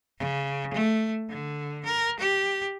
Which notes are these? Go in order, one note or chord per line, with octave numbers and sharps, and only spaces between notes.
C#3
A3
D3
A#4
G4